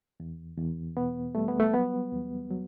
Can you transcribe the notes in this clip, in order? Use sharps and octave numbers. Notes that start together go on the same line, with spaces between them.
E2
E2
B2 B3
G3 A3
B3
A3
F#3 B3
E2
F#3